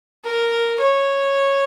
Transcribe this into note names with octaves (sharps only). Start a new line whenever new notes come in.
A#4
C#5